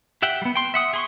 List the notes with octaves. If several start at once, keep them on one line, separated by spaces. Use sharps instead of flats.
G4 E5 F#5 G5
G3 B3
G5 C6
E5 F#5 D#6
G#4 C6 C#6